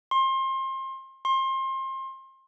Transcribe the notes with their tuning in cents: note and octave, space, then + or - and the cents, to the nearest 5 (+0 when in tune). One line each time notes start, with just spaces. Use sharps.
C6 +30
C6 +30